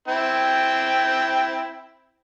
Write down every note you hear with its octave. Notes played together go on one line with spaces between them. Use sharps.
C4 E4 G5